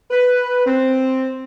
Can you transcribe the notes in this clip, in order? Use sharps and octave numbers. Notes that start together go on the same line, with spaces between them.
B4
C4